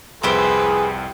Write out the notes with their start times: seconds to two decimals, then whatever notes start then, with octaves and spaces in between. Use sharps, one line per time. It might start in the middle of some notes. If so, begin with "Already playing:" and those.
0.23 C2 F2 E4 G4 G#4 B4 C5